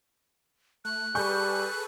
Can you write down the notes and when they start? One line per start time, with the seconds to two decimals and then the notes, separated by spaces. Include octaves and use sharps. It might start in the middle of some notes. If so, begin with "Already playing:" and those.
0.85 A3 F#6
1.15 G3 G#4 A4 B4 C#6 G6